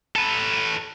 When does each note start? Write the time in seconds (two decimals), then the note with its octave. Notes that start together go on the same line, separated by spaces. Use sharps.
0.16 A4 B4